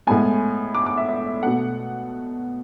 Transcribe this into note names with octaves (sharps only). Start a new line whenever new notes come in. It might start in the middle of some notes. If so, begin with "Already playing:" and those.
A2 G#3 B3 G#5
D6
D6
E5
E5
B2 A3 F#5